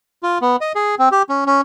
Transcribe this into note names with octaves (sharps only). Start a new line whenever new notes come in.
F4
B3
D#5
G#4
C4
G4
C#4
C#4